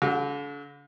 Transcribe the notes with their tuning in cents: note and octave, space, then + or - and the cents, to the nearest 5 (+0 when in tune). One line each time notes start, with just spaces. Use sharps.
D3 -40 F#4 +0